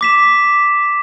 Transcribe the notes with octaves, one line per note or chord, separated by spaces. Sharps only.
D6 B6 E7